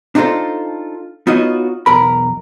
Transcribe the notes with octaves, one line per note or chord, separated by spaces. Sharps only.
D4 D#4 F4 F#4 A4 C5
B3 D#4 F4 F#4 C#5 D#5
B1 E2 A#4 B5